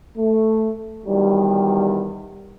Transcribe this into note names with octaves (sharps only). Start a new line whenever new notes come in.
A3
E2 D#3 F#3 G3